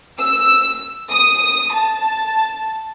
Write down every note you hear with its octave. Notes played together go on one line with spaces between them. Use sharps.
E6
D#6
A5